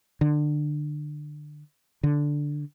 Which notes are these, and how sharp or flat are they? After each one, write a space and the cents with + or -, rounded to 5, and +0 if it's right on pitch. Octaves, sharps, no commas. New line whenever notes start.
D3 +20
D3 -5